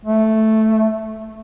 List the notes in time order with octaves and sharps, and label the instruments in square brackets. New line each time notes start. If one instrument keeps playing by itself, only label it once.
[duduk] A3